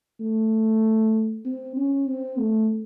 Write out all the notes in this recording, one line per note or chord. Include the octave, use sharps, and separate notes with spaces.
A3
C4
C#4
C4
A3